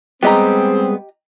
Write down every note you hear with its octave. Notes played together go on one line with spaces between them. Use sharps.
G3 G#3 B3 C4 G4 G#4 D#5 A#5